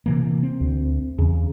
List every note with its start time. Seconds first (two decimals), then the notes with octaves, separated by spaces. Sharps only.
0.06 C3 E3 A#3
0.43 C4
0.61 D2
1.18 E2 C#3